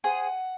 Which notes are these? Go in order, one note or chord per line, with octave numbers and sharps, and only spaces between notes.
G#4 C5 F#5